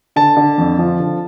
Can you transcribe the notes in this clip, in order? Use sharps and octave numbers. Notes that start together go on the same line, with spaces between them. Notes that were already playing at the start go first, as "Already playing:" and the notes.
D3 A5
D3
F2
F3
D3